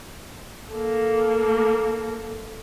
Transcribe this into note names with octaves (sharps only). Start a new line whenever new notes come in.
A#3 A4